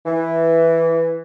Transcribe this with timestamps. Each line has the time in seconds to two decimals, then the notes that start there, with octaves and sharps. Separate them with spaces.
0.06 E3